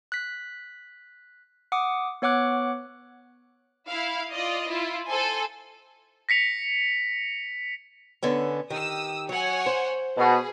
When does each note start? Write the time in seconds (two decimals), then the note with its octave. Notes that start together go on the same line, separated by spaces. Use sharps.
0.12 F#6 B6
1.72 F#5 D6 D#6
2.22 B3 C#5 F#5 D6 F#6
3.87 E4 F5
4.31 F4 D5 D#5
4.68 E4 F4
5.07 A4 C5 G#5
6.29 A#6 B6 C#7 F7
8.23 D3 B3 C#4
8.70 D#3 G4 D#6 E6
9.29 F#3 C#5 F#5 G#5
9.66 C5
10.17 B2 G#4 B4